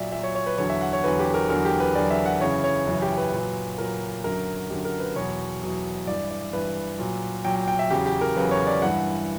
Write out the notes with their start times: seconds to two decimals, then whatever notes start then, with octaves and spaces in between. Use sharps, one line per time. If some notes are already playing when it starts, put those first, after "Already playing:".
Already playing: A#2 F#3 D5 E5
0.12 A#2 F#3 E5
0.23 C#5
0.35 C#5
0.46 B4
0.58 E2 D3 F#3 C#5
0.69 E5
0.81 F#5
0.93 C#5
1.04 E2 D3 F#3 B4
1.19 G4
1.34 A#4
1.49 E2 D3 F#3 A#4
1.65 G4
1.80 B4
1.95 E2 D3 F#3 D5
2.10 E5
2.26 F#5
2.41 F#2 C#3 E3 C#5
2.64 C#5
2.87 F#2 C#3 E3
3.02 G4
3.17 B4
3.33 A#2 F#3
3.78 A#2 F#3 A#4
4.24 F#2 D3 F#3 A#4
4.70 F#2 D3 F#3 G4
4.85 A#4
5.00 B4
5.16 E2 B2 F#3 C#5
5.62 E2 B2 F#3
6.07 G2 E3 D5
6.30 D5
6.53 G2 E3 B4
6.99 A#2 F#3
7.45 A#2 F#3 G5
7.56 G5
7.68 G5
7.79 E5
7.90 E2 C#3 F#3 G4
8.06 G4
8.21 A#4
8.36 E2 C#3 F#3 B4
8.51 C#5
8.67 D5
8.82 G2 E3 F#5